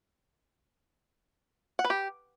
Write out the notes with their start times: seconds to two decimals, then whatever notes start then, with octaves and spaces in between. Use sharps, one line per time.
1.79 F#5
1.84 B4
1.90 G4